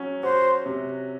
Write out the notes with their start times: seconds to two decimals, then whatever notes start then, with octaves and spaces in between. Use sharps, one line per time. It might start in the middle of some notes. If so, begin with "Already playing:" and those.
Already playing: F#3 C#4
0.23 F#4 C5
0.66 C3